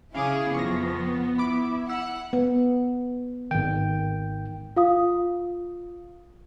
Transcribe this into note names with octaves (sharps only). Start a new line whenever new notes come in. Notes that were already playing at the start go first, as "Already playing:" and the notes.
C#3 C#4 E4 G#4 F5 D6 D#6
F2 F3 B3 C#6 F6 A#6
E4 B5 D6
F#5 E6
B3
G#1 D#3 G5
F4 F5 D#6